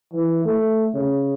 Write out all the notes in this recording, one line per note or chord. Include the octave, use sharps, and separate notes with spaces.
E3
A3
C#3